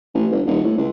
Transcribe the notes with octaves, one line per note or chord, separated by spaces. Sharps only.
A1
G1
D#1
A2
C#2